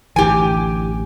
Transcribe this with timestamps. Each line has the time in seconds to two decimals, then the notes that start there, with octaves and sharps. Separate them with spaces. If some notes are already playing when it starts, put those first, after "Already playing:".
0.16 A1 D2 E3 G4 G#5